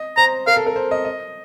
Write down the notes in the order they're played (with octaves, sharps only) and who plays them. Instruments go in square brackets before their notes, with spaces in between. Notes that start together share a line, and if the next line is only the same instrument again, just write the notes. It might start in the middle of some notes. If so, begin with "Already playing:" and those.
Already playing: [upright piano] D#5
[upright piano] C5 [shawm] A#5
[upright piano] A#4 [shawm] F5
[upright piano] A4
A#4
C5
D#5
D#5